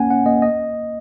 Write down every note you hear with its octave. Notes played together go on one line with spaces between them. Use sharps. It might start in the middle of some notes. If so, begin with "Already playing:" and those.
Already playing: A#3 C#4 F#5 G#5
C#4 F#5
A#3 D#5
D#5